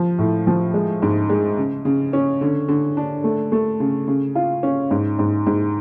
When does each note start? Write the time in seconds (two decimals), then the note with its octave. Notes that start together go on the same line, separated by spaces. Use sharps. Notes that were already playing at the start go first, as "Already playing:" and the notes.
Already playing: F3
0.18 A2
0.47 F3
0.74 G#3
1.02 G#2
1.29 G#3
1.57 C#3
1.85 C#3
2.13 C#4
2.41 D3
2.68 D3
2.97 D4
3.24 A3
3.52 A3
3.80 C#3
4.07 C#3
4.35 F4
4.63 C#4
4.91 G#2
5.19 G#2
5.46 G#2